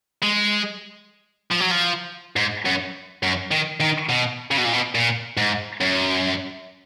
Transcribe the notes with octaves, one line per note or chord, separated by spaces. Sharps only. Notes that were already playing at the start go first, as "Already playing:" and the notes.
G#3
F3
F#3
F3
G#2
F#2
F#2
D#3
D#3
B2
C#3
B2
A#2
B2
A#2
G#2
F#2